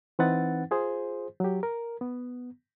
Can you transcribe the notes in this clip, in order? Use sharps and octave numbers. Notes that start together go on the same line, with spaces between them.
E3 C4 D#4 B4 F#5 A6
F4 G#4 C5
F#3 G4
A#4
B3